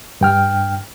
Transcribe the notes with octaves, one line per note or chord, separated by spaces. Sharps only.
G2 G5 F6